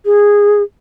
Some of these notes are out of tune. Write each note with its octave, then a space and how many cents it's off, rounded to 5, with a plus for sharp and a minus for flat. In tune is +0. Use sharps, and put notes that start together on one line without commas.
G#4 -10